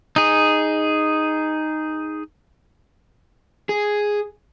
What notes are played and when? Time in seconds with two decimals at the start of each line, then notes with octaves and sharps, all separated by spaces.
0.16 D#4 G#4
3.69 G#4